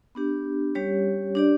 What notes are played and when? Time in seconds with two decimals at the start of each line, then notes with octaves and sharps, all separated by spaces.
0.15 B3 D4 G4
0.75 G3 C#4 G4 C#5
1.35 D4 G4 D5